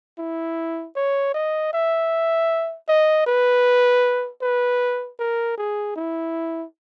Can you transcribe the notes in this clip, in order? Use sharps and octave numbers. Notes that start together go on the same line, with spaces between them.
E4
C#5
D#5
E5
D#5
B4
B4
A#4
G#4
E4